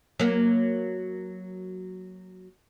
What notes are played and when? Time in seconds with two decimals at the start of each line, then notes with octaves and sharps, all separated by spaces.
0.20 F#3 A#3